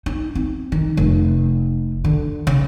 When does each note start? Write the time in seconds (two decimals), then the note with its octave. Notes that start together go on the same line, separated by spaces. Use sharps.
0.06 D#4
0.35 C4
0.72 D#3
0.97 F1
2.04 D3
2.47 C#3